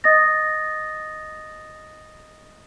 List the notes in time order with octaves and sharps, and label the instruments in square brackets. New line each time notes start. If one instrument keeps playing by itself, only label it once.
[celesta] D#5 D#6 A6 A#6